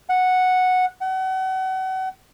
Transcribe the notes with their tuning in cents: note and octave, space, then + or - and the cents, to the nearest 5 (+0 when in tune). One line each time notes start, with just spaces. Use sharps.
F#5 -5
F#5 +35